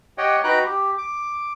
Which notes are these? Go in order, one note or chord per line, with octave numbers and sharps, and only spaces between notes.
G4 C#5 D#5 F#5 G5
D#4 F#4 B4 G5 A#5 F#6
G4
D6